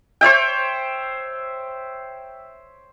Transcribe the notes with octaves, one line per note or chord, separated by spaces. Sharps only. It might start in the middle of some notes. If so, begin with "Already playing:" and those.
C5 C#5 E5 G5